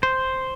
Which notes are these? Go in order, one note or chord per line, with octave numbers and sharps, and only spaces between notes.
C5